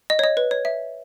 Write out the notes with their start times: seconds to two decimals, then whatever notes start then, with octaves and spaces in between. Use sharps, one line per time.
0.10 D#5
0.19 C#5
0.24 D#5
0.37 B4
0.51 C#5
0.65 E5